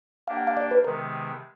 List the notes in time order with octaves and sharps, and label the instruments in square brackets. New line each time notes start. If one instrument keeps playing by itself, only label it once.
[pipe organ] A#3 D4 G4 [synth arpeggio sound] F5
[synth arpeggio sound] F#5
F5
D5
B4
[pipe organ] C3 D#3 G#3 B3 [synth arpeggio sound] A#4